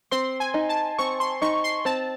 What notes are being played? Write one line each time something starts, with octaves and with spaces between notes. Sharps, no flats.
C4 C6
G#5
D#4
A5
C4 C#6
C6
D#4 C#6
C6
C4 A5